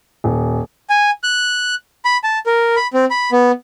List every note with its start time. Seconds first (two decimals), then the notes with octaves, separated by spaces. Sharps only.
0.24 D#1
0.90 G#5
1.24 F#6
2.05 B5
2.24 A5
2.46 A#4
2.76 B5
2.94 C4
3.11 B5
3.32 B3